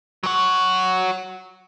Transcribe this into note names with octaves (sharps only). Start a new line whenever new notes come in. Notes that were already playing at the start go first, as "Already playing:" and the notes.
F#3 F#4